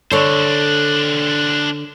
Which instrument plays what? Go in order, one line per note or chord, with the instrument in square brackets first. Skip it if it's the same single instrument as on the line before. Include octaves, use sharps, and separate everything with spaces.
[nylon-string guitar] D3 A4 C#5 [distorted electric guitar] D4 C5